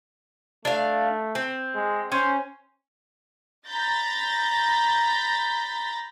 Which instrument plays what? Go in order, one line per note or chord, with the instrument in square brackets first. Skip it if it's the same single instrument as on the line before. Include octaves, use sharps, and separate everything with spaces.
[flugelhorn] A3 [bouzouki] D4 F5
[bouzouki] C4
[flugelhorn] G#3
[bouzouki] C#4 [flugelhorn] C5
[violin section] A#5 B5 G6 A6 A#6